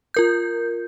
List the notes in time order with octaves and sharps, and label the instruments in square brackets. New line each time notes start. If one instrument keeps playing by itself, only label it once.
[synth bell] F4 A#4 G6